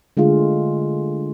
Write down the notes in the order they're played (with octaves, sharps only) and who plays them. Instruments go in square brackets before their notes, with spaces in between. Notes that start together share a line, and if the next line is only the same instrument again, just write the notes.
[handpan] D3 G#3 A3 F4 G#4